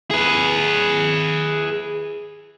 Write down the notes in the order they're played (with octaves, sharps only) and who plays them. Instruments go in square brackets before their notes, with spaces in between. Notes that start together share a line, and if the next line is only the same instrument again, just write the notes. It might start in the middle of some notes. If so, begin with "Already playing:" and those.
[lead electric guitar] G#4 B4